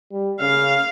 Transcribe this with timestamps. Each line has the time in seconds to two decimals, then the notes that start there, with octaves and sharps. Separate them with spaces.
0.12 G3
0.40 C#3 F5